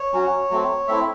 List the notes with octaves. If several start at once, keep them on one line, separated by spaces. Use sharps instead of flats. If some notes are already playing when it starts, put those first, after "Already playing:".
Already playing: C#5
F#3 C#4 F#4
F#3 A3 C4
A3 C4 E4 E5